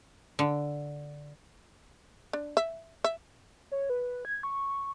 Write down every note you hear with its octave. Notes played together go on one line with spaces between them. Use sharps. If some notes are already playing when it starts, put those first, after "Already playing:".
D3
D4
E5
E5
C#5
B4
G#6
C#6